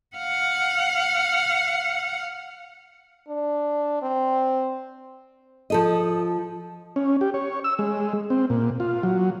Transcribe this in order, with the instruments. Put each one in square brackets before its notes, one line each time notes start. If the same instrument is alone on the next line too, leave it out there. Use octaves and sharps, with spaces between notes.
[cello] F5 F#5
[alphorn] D4
C4
[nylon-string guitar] F3 A4 D#5
[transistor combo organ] C#4
G4
C#5
E6
G#3
C4
A#2
F4
F#3